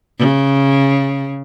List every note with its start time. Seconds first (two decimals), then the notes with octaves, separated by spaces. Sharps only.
0.19 C#3